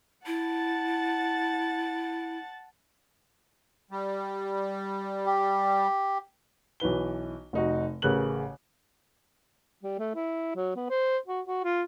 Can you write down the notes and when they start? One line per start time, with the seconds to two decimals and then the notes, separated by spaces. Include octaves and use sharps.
0.26 E4 F#5 A5 A6
3.91 G3
5.26 G4
6.80 B1 E3 B4 G7
7.53 F1 D#4 F#4
8.02 A1 C#3 A#4 B4 F#6 F#7
9.83 G3
9.99 A3
10.15 E4
10.56 F#3
10.76 B3
10.90 C5
11.27 F#4
11.47 F#4
11.64 F4